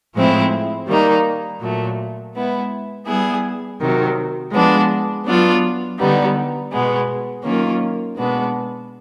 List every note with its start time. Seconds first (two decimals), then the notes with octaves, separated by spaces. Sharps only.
0.15 A2 F3 G#3 C4 E4
0.87 D#3 G3 A#3 D#4
1.61 A#2 F#3 A3
2.34 G#3 B3 E4
3.06 G3 B3 E4 G#4
3.80 C3 D#3 F#3
4.52 F3 G#3 B3 D4
5.25 F#3 B3 D4 F4
5.98 D3 G3 B3 D#4
6.71 B2 G#3 B3
7.44 D#3 F#3 A#3 C#4 F4
8.17 B2 G#3 B3 D4